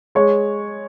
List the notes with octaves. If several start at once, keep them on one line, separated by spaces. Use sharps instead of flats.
G#3 C#5